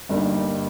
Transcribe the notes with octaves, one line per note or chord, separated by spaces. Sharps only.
G1 G2 G3 A#3 D#4